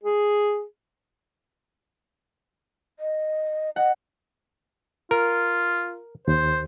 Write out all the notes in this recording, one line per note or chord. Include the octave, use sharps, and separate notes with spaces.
G#4
D#5
D#5 F#5
F4 A#4
D#2 C5